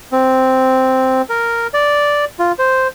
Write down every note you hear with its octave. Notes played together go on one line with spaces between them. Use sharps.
C4
A#4
D5
F4
C5